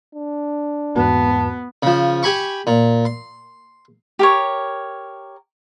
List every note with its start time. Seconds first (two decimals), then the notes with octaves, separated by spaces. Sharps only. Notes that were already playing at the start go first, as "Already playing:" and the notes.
0.15 D4
0.96 E2 G#2 B3 F#4 A5
1.83 C#3 F3
2.23 G4 G#5 B5 C#6
2.67 A#2
3.05 C6
4.19 G4 A#4 C#5